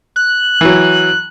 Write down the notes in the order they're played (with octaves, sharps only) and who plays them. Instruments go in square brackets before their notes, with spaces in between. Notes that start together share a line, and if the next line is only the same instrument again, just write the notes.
[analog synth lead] F#6
[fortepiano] E3 F#3